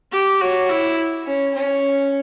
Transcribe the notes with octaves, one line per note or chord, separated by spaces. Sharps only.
G4
F#4 C#5
E4
C#4
C#4